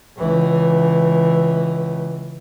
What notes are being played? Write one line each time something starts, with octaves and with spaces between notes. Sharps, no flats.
C#2 E3